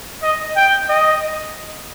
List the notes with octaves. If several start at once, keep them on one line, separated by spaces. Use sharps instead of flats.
D#5
G5
D#5